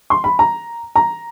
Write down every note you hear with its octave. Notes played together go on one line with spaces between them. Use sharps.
C6
B5
A#5
A#5